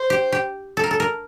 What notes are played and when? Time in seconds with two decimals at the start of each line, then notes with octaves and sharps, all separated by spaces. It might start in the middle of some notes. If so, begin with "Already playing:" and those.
Already playing: C5
0.10 G4
0.32 G4
0.77 A4
0.84 A#4
0.91 A4
1.00 A#4